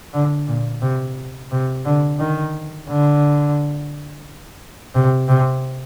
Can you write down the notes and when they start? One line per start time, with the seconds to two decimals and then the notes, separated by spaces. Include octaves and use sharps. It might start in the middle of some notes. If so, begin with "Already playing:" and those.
0.14 D3
0.47 A#2
0.82 C3
1.51 C3
1.85 D3
2.19 D#3
2.89 D3
4.95 C3
5.28 C3